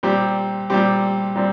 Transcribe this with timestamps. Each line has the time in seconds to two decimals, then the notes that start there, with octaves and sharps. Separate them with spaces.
0.03 A#2 G3 C4 G4
0.70 A#2 G3 C4 G4
1.35 A#2 G3 C4